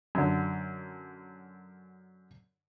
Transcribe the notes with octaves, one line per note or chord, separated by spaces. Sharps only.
F#2 D3